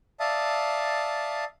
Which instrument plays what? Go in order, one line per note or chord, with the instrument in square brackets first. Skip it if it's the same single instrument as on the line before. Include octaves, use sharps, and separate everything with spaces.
[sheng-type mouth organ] D5 E5 F5 A5 D#6